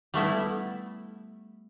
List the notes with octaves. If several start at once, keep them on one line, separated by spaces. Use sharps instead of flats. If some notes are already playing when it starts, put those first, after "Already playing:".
G3 A3 B3 E4